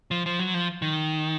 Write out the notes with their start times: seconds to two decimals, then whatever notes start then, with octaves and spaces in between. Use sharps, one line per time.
0.11 F3
0.26 F3
0.39 F#3
0.54 F3
0.82 D#3